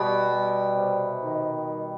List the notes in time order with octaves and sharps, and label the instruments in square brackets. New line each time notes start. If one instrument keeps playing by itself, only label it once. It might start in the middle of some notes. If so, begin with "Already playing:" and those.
Already playing: [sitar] B2 [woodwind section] G3
[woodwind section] G3
C3
D#3
G3